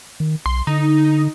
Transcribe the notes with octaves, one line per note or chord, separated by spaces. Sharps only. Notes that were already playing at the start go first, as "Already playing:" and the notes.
D#3
B1 C6
D3 D#4